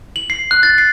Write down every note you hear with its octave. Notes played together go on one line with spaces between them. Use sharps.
F#7
C7
F#6
A6
C7